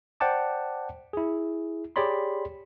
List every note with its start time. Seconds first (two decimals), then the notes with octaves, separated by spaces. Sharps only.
0.20 C5 D5 F#5 G5 A5 D6
1.13 E4 G#4
1.96 G4 G#4 C#5 D5 B5 C6